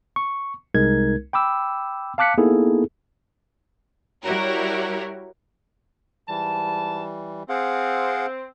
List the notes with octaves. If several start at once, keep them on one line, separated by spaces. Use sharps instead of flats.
C#6
C2 G#3 D#4 A#4 G#6
G5 B5 D6 E6
F5 A5 D6 F#6 B6 C#7
A#3 B3 D#4 E4 G#4 A4
G3 E4 F#4 G4 A#4 C#5
G#2 E3 G3 A5
C4 G#4 F5 F#5